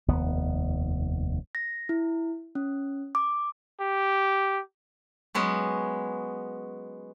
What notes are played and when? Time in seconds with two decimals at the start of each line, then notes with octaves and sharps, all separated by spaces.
0.08 F1 D#2 B3
1.55 A#6
1.89 E4
2.55 C#4
3.15 D6
3.81 G4
5.35 F#3 G#3 B3 C#4